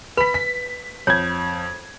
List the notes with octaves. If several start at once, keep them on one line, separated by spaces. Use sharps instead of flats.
B4 B5 B6
B6
F2 C#5 G#6